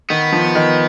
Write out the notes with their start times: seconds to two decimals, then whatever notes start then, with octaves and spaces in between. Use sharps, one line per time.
0.10 D#3 B3
0.32 F3
0.55 D#3